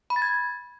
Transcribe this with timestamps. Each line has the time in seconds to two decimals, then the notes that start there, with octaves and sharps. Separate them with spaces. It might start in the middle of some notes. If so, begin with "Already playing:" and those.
0.10 B5
0.16 A6
0.22 G#6